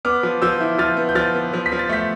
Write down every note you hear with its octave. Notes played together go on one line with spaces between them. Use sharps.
B3 D6 F6
F3
F3 E6 G6
E4
F3 F6 A6
B3
G6
F3 F6 A6
B3
F3
B6
F3
A6
A3 G6 B6